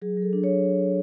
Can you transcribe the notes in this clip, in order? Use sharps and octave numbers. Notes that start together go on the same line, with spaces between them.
F#3 G#4
F#3
A4
D4
C#5